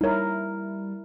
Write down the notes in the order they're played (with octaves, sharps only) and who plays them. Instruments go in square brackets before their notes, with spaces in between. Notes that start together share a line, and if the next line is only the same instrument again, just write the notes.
[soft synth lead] G3 [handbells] D#4 C#5 [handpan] E4 A#4